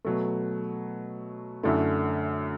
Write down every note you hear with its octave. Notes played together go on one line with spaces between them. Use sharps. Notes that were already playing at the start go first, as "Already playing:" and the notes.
B2 F#3 A3
F#2 D3 A3 E4